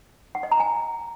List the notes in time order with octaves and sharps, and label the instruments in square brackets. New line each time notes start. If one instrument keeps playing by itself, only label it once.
[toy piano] F#5
D#5
A#5
G#5